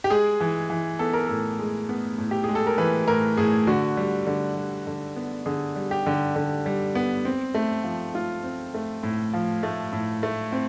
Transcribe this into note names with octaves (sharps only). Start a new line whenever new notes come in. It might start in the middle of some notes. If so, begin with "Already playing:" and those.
G4
G#3 G#4
E3
E3
B3 A4
A#4
A2 A4
G#3
B3
A2
G4
G#3 G#4
A4
A#4
E3 B4
A2 A#4
A2 G#4
D3 F#4
G3
D3
G3
D3
B3
D3 G#4
G3
G4
D3
D3
G3
B3
C4
A3
F3
A3 F4
C4
A3
A2
F3
A3
A2
A3
C4